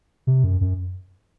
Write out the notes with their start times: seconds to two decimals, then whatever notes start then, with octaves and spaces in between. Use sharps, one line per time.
0.27 C3
0.44 F#2
0.61 F#2